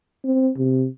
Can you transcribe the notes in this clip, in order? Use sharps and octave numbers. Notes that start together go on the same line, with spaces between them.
C4
C3